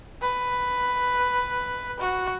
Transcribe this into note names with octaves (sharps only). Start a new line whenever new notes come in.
B4
F#4